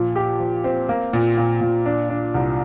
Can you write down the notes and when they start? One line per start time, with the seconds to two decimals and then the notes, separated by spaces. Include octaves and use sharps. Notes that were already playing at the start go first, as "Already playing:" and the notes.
Already playing: A#2 F3
0.16 G4
0.39 F3
0.64 C4
0.89 A#3
1.13 A#2
1.37 A#2
1.61 A#2
1.86 D4
2.09 D4
2.35 C2